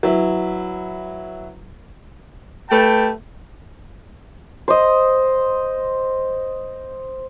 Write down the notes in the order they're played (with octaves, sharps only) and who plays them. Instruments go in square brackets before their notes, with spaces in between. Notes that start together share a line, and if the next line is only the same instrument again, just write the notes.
[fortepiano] F#3 E4 B4
[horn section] A3 G4 B4 G5 A5
[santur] C5 D#5